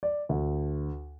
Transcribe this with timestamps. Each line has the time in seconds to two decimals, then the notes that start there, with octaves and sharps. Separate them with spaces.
0.03 D5
0.29 D2